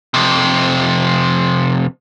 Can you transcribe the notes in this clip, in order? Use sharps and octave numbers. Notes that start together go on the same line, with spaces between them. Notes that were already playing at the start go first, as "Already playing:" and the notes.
F2 C3